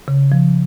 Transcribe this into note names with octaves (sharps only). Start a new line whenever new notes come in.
C#3
F3